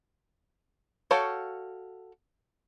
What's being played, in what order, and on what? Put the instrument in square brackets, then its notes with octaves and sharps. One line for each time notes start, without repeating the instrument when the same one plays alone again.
[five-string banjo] F#4 A4 C#5 F5 G5